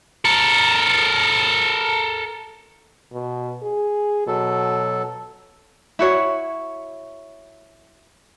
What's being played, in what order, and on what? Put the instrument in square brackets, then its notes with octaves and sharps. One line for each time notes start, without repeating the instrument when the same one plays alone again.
[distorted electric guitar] A4 A#4
[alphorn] B2
G#4
[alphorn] B2 [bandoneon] F#3 A4
[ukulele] E4 F#4 C#5